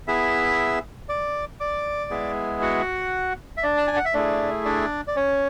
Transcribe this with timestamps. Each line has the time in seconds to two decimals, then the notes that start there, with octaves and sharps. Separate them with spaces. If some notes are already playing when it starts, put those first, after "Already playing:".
0.08 B3 E4 G#4 E5 E6
1.09 D5 D6
1.60 D5 D6
2.11 G#3 B3 E4 G#4
2.62 F#4 F#5
3.57 E5
3.63 D4 D5
3.77 A5
3.87 G#5
3.96 F#5
4.05 E5
4.14 A3 D4 E4 G#4 D5
4.65 D4 D5
5.08 D5
5.16 C#4 C#5